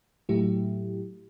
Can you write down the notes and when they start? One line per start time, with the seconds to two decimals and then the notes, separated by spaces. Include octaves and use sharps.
0.29 A2 F#3 A3 E4 G4